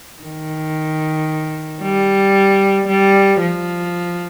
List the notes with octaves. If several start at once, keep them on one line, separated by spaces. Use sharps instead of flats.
D#3
G3
G3
F3